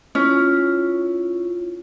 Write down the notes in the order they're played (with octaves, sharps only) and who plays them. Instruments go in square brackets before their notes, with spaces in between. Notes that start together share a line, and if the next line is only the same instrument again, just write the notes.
[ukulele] C#4 [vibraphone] E4 F4